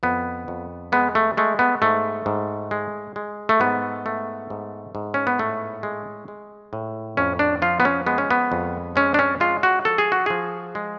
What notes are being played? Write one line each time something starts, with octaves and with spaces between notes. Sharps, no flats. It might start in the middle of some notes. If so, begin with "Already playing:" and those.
F2 B3
F2
G#3 B3
A3
G#3 A3
B3
G#2 A3
G#2
G#3
G#3
A3
G#2 B3
A3
G#2
G#2
C#4
B3
A2 A3
G#3
G#3
A2
F2 C#4
D4
F3 F4
B3
C#4
G#3 B3
C#4
B3
F2
G#3 C#4
D4
C#4
G#3 F4
F#4
F3 A4
G#4
F#4
F3 G#4
G#3